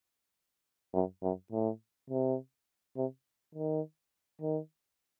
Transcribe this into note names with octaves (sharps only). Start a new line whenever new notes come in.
F#2
F#2
A2
C3
C3
D#3
D#3